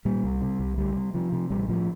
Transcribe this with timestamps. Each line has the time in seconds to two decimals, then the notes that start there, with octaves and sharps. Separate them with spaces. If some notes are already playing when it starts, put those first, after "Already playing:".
0.05 A#2 G3
0.24 C2
0.42 C3
0.59 C2
0.78 D2 G3
0.96 C3
1.14 C3 F3
1.32 C3
1.50 A1 G3
1.69 A2 F3